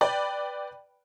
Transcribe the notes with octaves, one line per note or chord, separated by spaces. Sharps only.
B4 D5 G5 B5